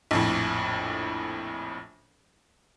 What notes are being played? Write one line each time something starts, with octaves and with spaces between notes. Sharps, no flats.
A#1 F2 A2